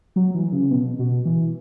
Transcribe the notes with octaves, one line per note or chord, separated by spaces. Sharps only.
F#3
E3
C#3
B2
B2
E3